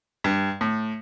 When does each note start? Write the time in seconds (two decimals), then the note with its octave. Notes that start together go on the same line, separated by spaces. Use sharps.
0.24 G2
0.61 A2